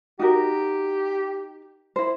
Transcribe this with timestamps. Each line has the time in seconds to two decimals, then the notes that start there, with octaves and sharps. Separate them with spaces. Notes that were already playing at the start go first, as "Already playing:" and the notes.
0.19 D#4 F#4 G4 A#4
1.96 E4 C5